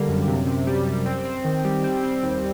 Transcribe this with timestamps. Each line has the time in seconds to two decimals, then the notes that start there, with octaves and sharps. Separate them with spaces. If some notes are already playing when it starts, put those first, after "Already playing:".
Already playing: D3 G3 A#3
0.09 F#2
0.28 C3
0.47 C3
0.67 G3
0.86 G3
1.06 C4
1.25 C4
1.45 D#3
1.65 G3
1.84 C4
2.03 C4
2.23 D#2